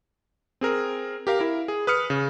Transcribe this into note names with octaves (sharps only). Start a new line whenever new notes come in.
C4 G#4 A#4
G4 A#4 F5
E4 A#4
G#4
B4 D#6 F6 C#7
C#3